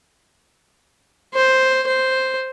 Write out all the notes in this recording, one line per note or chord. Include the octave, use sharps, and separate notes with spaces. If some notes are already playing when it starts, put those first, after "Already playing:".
C5
C5